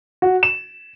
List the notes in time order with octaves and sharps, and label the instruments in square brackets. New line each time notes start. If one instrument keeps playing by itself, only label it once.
[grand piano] F#4
E7